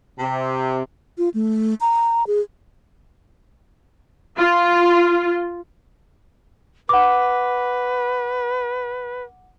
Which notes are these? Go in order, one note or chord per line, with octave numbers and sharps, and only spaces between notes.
C3
F4
A3
A#5
G#4
F4
B4 F#5 D6